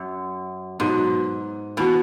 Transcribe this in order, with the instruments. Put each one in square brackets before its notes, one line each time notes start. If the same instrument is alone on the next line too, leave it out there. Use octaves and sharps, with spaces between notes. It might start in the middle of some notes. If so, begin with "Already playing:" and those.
Already playing: [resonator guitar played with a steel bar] F#2
[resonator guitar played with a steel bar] G#2 [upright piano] B2 F#3 B3
[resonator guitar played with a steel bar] B2 [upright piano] E3 B3 F#4